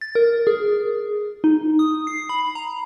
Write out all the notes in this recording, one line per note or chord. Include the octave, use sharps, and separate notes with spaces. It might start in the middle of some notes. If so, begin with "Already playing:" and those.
A6
A#4
G#4
D#4
D#6
C7
B5
A#5